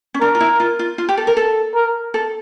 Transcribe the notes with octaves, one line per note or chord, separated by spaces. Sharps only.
C#4
D4 A#4
F4
E4
F4
F4
F4
G4
A4
A#4
A4
A#4
A4